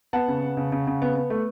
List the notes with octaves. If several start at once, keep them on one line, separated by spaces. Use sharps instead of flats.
B3 F#5 A5
C#3
B3
C#3
C#3
C#3
B3
B3
A3